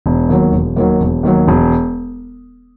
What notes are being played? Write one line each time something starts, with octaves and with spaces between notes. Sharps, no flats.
E1
D#2 D#3 F#3
E1
D#2 D#3 F#3
E1
D#2 D#3 F#3
E1